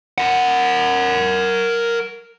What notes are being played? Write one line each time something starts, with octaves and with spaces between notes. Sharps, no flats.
A#4 F#5